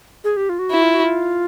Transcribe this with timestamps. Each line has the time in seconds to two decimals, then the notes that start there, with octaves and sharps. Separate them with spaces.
0.24 G#4
0.37 G4
0.49 F4
0.59 F#4
0.71 E4
0.82 F4
0.94 F#4
1.04 F4